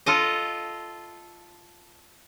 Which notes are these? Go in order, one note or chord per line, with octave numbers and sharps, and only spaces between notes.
F4 A4 D#5